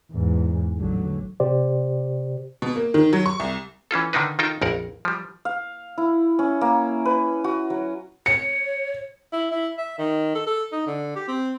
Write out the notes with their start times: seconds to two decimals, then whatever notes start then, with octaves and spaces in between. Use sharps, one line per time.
0.13 E2 G#2
0.78 A1 D3 F#3
1.40 C3 G4 C5 D5
2.62 B2
2.76 A#3
2.94 D#3
3.13 F#3
3.26 C#6
3.40 C2
3.91 E3 C#4 F4 A4
4.13 D3 D#3 D4 D#4 B4
4.39 D#3 D#4 F4 A4 G5
4.62 A#1 F2 A#4 F#5
5.05 F3 G3
5.45 F5
5.98 E4
6.39 C#4
6.61 A#3
7.05 B4
7.44 F#4
7.70 F#3
8.26 C#5 C#7
9.32 E4
9.51 E4
9.78 E5
9.98 D#3
10.35 A4
10.47 A4
10.72 D#4
10.86 D3
11.16 G4
11.28 C4